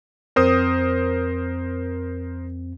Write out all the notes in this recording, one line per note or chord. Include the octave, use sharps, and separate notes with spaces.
F2 C4 A#4 C5 D#6